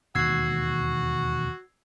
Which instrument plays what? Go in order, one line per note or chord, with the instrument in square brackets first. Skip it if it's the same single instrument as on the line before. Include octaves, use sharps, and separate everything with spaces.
[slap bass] E1 D#2 [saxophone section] F#4 [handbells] E6 G#6 C7